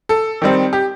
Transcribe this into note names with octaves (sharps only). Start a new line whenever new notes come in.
A4
D#3 G3 C4
G4